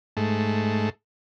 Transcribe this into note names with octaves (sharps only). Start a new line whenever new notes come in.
G#2 A3